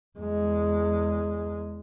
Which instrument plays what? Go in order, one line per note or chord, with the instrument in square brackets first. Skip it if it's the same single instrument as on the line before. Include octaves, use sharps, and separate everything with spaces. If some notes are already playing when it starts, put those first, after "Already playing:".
[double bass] E2 G#3